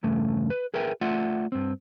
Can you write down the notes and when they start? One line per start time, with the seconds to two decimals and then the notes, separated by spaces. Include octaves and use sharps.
0.03 E2 G2 C#3 A3
0.50 B4
0.74 G#4 A#4 B4 E5 G5
1.01 A3 F4 D5 E5 F#5
1.52 G2 C4